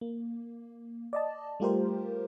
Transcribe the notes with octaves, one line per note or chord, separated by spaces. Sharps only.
A#3
D5 D#5 A5
G3 A3 F4 G4 A#4 C5